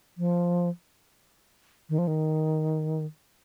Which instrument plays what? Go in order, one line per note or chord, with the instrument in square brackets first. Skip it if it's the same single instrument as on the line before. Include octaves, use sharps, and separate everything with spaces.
[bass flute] F3
D#3
F3
D#3